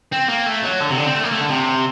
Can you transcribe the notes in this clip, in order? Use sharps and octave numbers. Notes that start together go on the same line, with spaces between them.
C4
A#3
A3
F#3
D3
C3
D3
C4
A3
A#3
A3
D3
C3